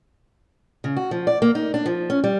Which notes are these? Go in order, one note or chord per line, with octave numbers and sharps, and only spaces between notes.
C#3
F#4
F3
D5
A#3
D#4
D4
F3
C#4
G3